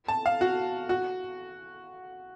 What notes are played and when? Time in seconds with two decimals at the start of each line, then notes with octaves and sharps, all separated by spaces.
0.08 A5
0.26 F5
0.41 F#4
0.89 F#4